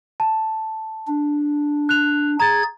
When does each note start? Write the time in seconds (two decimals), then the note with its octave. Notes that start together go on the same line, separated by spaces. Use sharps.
0.20 A5
1.07 D4
1.89 F#6 F7
2.40 G#4 A#5 G#6 A6